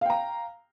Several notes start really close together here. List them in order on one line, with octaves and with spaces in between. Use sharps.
F5 G5 A#5